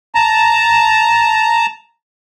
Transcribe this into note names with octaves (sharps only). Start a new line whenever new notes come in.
A5 A#5